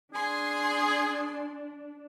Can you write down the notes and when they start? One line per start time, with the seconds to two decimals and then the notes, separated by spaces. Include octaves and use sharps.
0.14 D4 G#4 G#5 C6